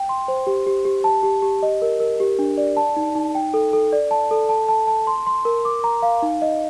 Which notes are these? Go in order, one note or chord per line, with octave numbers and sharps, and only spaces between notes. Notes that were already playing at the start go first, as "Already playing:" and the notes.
Already playing: G5
C6
C5
G4
G4
G4
A5
G4
G4
D#5
A#4
A#4
G4
D4
D5
A5
D#4
D#4
G5
A4
A4
D5
A5
A4
A5
A5
A5
C6
C6
A#4
D6
A#5
F5
D#4
D#5